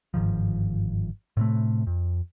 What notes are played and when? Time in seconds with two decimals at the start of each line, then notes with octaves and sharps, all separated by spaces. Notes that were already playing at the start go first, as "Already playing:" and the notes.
0.14 G1 G#2 D#3 F3
1.37 A2 C3 A3
1.87 F2